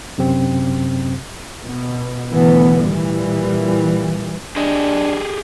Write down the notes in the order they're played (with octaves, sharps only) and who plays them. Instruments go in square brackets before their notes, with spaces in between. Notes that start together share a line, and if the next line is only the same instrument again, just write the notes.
[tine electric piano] F#2 C3 C4
[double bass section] B2
G#1 D2 B2 E3 B3
A#2 E3 G3
[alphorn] D4 [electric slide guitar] G4 G#4 D#5